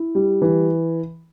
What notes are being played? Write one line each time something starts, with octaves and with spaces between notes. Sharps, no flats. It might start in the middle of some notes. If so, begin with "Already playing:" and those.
Already playing: E4
G3
E3